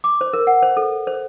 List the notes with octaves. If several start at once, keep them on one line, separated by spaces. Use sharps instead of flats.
D6
C5
A#4
F#5
C5
A4
C5